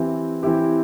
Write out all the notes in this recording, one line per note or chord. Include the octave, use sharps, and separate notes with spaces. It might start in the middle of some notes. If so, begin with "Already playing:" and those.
Already playing: E3 C4 E4 G4
E3 C4 E4 G4